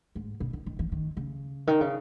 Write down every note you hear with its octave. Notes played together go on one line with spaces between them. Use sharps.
G#2
B2
D#3
D#3
E3
D#3
C#3
D#3
C#3